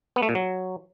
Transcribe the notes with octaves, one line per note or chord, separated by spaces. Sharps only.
B3
A3
A#2
F#3